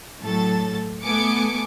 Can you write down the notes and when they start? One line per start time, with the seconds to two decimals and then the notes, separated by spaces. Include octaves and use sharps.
0.23 A2 F#3 A4 A6
1.03 A3 B3 A4 G#5 D6 C#7